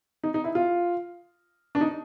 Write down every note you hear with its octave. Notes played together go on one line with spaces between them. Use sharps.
D#4
D#4
E4
F4
D4
D#4